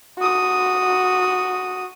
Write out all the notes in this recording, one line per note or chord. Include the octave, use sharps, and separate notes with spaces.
F#4 D#6